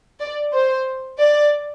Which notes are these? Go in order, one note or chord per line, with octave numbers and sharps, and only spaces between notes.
D5
C5
D5